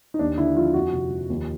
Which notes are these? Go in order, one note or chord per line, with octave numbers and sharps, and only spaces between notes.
D#4
D#2 D4
D3 E4
F3 F4
F2 F#4
C3
F3
D#2